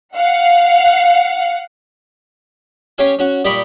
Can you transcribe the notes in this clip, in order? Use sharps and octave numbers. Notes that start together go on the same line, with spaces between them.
F5 F#5
C#4 G4 C#5 F5 G#5
C#4 F#4
A#2 G3 G4 D#5 B5 C#6